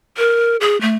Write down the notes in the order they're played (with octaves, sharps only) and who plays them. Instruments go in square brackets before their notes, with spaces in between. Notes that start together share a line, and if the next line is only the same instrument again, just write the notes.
[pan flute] A#4
G#4
A3